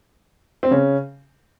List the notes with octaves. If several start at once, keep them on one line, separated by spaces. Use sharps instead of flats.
C4
C#3 C#4